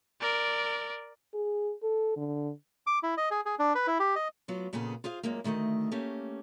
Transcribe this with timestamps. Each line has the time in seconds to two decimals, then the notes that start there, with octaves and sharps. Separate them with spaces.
0.21 A#4 D5
1.34 G#4
1.83 A4
2.17 D3
2.87 D6
3.03 E4
3.17 D#5
3.31 G#4
3.46 G#4
3.59 D4
3.75 B4
3.87 E4
4.00 G4
4.16 D#5
4.48 F#3 B3 F4
4.73 F2 A#2 C#3 B3 G#4 A4
5.04 F4 G#4 C5 F5
5.23 F#2 A#2 G#3 A#3
5.44 D2 D#3 A3 C#5 D#5
5.92 A3 A#3 C#4 G4